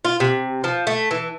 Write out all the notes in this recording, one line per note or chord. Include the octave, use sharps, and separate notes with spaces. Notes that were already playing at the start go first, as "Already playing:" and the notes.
F4
C3
F3
A3
E3